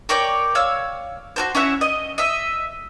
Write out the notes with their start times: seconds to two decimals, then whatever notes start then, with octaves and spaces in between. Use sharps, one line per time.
0.09 A#4 C#5 D5 G5
0.55 C#5 F5 E6
1.36 F#4 A#4 C5
1.55 C#4 E4 E5 F#5
1.81 D#5
2.18 D#5 E5